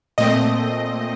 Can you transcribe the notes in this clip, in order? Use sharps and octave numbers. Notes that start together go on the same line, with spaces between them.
A#2 A3 C4 D#5